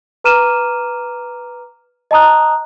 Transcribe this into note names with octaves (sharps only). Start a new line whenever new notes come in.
B4 A#5 D6 F6 D#7 E7
D#5 A5 A#5 D#6 F#6